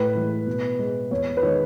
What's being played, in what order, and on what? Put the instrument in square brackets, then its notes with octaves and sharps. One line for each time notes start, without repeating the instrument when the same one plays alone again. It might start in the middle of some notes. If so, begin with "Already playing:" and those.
Already playing: [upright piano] A2 B4
E3 G#3
B2
G#3
E2 C#5
B4
D#3 G#3 C#5